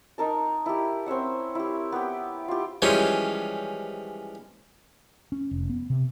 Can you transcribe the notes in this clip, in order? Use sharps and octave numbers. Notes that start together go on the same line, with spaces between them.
D#4 A#4 A5
E4 G4
C4 C#4 E5 F#5
E4 G4
B3 G4
F4 G4
E3 F3 G3 G#3 C#4
C#4
F1
B3
C3